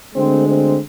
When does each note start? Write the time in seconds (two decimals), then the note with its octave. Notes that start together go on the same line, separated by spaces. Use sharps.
0.15 D2 D3 G#3 C4
0.47 C4